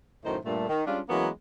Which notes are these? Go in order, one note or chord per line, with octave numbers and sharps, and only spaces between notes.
F#2 A2 D#3 D#4 C5
G2 A#2 A3
D#3
G3 G#3 C#4 D4 F4
E3 F#3 G#3 A#3 B3 C#4